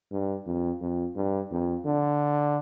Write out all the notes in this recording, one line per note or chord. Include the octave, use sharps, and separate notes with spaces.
G2
F2
F2
G2
F2
D3